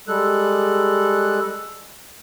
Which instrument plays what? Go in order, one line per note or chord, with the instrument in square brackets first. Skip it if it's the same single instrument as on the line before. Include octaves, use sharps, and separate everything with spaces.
[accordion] G3 G#3 A4 F#6